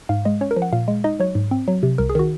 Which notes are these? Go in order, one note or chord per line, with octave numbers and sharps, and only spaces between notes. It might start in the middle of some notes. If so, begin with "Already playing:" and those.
G#2 F5
G#3 D#5
C#4 C#5
A#4
F3
F#5
A#2 F5
G#3
D#4 D#5
F#3 C#5
G#2
C4
F#3
C3
C2 A#4
G#4
D#3 F#4